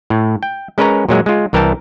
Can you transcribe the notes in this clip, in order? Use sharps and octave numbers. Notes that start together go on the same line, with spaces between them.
A2
G5
G#3 C#4 A#4 B4 C#5 A#5
A#2 F#3 G#3
G#3 F4
C2 E3 A#4 G5 A5